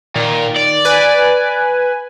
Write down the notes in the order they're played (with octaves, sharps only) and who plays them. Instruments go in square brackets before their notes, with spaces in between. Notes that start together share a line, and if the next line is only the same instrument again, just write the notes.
[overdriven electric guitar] A#2 [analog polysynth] D#3
[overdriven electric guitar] D5
[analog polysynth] B4 G#5